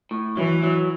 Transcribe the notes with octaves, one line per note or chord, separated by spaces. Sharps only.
A2
E3 F#3
F#3